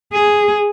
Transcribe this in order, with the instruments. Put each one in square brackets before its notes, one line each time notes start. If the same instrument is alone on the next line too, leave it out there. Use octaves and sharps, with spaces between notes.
[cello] G#4